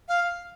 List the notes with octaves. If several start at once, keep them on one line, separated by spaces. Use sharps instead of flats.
F5